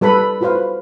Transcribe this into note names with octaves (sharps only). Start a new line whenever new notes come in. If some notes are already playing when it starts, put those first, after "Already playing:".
G3 A4 B4 B5
F4 F#4 B4 C5 F5